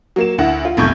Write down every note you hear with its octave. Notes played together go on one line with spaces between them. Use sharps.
F#3 A#3 E7
D2 E4 F#5 A#6
F4
F1 B1 A3 C#6 G6 G#6